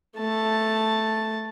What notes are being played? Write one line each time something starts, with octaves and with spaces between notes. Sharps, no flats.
A3 A5